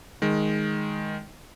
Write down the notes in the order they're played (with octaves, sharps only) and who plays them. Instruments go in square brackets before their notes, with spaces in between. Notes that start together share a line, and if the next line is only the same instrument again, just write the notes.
[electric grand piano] D#3 G#3